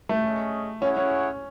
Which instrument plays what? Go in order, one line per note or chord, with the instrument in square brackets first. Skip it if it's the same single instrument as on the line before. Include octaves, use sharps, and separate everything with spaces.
[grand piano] A3
[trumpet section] C#4 G#4 D#5
[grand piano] C#4 [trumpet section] E4 G#4 C#5 F#5
[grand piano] C#4